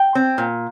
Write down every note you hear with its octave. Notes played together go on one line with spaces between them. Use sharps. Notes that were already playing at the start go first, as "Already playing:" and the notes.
Already playing: G5
C4
A#2